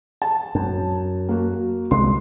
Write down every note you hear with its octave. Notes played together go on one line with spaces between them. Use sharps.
A5
F#2
A#3 F#4
C2 G#3 C6